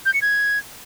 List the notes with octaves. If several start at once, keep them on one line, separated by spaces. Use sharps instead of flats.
G6
C#7
G#6